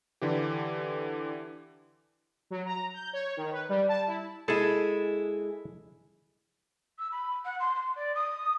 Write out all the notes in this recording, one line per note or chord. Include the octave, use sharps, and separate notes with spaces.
D3 E3 G4
F#3
A#5
G6
C#5
D#3
B4
G3
A5
E4
G#3 E4 G#4 A4 A5
E6
B5
F#5
C6
C6
D5
D#6